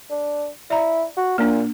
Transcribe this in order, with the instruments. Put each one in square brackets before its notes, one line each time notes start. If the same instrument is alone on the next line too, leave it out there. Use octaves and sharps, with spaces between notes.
[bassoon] D4
[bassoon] E4 [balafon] D5 A#5
[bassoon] F#4
[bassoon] A#2 [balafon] A#3 D4